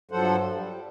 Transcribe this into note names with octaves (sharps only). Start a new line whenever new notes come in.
G2 F3 F#3 A4 C5 F#5
G3